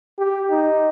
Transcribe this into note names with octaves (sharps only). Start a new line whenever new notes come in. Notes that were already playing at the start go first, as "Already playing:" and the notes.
G4
D#4